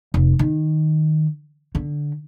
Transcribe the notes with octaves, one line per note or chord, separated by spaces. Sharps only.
F1
D#3
D3